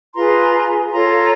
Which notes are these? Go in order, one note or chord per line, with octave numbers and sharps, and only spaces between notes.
F4 G#4 B4 A#5 C6
F4 A4 C#5 A#5 C6